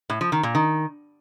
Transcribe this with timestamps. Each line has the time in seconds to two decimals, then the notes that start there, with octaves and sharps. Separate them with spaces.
0.10 A2
0.21 F3
0.32 D#3
0.43 A#2
0.55 D#3